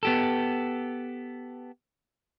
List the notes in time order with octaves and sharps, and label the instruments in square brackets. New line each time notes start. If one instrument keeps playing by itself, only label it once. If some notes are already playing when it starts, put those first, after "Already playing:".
[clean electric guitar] B3 G4 A4